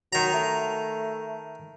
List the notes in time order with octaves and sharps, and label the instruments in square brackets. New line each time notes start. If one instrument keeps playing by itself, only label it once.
[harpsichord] D#3 A#5 [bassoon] F#3
[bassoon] A3